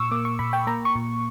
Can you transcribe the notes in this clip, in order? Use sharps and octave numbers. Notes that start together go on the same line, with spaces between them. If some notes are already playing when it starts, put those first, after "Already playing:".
Already playing: A#2 C#6 E6
A#3 D6
C#6
A#2 B5
G5
A#3 A#5
C#6
A#2